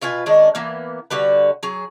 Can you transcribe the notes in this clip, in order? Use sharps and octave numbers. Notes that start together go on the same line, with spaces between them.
B2 F4 B4 G#5
D#3 G#3 C#4 D4
E3 A#3 B3
D3 G3 F#4 B4
F#3 G#4